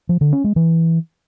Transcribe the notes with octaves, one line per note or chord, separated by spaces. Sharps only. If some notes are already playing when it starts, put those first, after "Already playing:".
F3
D3
C#4
G#3
E3